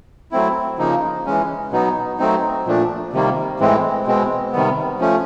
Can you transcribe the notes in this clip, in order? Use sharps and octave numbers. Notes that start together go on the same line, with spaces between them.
F#3 A3 C4 E4
C#3 F3 A#3 D#4
E3 G#3 C#4
B2 F#3 B3 D#4
F#3 A3 C4 D#4
A#2 F3 A3 D4
C3 D#3 G3 A#3
A2 E3 G#3 C4
B2 G#3 C4
C3 D#3 G3 B3
F3 A3 C#4